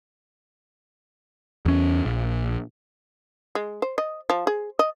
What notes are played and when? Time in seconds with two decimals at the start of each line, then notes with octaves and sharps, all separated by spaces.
1.66 E2 C#4
2.05 A#1
3.55 G#3
3.82 C5
3.98 D#5
4.30 F3
4.47 G#4
4.79 D#5